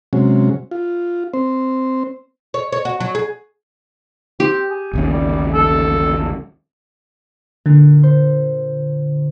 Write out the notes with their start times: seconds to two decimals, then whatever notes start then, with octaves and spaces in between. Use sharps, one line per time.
0.13 C3 F#3 G#3 C#4
0.71 F4
1.33 C4 C5
2.54 C#5
2.72 C#5
2.85 F#4
3.00 F#3
3.15 G#4
4.40 C4 G4
4.70 G#4
4.93 A1 D#2 C#3
5.11 G3
5.54 A4
7.66 A#2 D3
8.03 C5